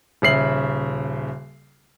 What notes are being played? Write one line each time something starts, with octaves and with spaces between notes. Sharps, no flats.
D#1 C#3 E5 C7 F#7